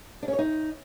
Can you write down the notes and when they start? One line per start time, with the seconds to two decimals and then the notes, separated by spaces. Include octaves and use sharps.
0.22 D4
0.28 C#4
0.33 C#5
0.39 D#4